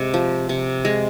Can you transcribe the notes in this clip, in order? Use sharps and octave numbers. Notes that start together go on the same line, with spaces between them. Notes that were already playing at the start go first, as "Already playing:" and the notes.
Already playing: C3 G#3
F3
C3
G#3